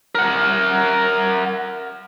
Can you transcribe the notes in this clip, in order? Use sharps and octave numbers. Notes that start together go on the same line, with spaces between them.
A#4 F#5